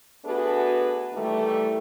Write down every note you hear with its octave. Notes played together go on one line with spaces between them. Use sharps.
A3 B3 D4 F#4 G#4 B4
D#3 E3 G3 A3